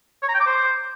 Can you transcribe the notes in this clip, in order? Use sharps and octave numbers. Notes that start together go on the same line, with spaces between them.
C#5
A#5
G5
D6
C5